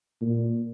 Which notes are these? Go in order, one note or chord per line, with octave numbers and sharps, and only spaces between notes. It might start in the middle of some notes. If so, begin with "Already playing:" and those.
A#2